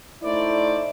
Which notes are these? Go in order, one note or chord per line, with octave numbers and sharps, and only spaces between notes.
A3 D#4 E4 C5 D5